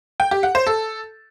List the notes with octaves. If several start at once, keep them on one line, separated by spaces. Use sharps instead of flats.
G5
G4
F#5
C5
A4